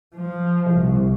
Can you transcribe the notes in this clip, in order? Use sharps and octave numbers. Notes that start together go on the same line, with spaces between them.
F3
C2